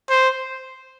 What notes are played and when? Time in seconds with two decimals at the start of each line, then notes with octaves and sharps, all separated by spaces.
0.10 C5